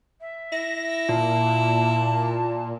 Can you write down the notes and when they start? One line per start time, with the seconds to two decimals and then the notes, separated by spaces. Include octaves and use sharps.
0.21 E5
0.52 E4 A#6
1.09 A#2 A5